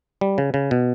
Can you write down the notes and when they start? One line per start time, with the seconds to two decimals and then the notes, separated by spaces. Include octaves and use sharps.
0.21 G3
0.38 C#3
0.54 C#3
0.71 B2